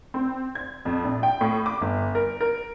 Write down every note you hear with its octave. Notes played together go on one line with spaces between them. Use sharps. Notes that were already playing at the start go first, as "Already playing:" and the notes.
C4
G#6
F2
A#1
G5
A2
D6
G1
A#4
A#4